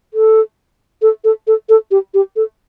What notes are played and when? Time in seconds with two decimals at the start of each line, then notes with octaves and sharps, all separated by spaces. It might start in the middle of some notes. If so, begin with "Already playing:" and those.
0.14 A4
1.02 A4
1.24 A4
1.47 A4
1.69 A4
1.91 G4
2.14 G4
2.36 A4